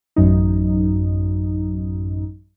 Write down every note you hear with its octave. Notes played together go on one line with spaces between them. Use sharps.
A1 F#2 D#4